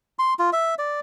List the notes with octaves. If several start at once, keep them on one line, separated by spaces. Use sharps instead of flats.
C6
F4
E5
D5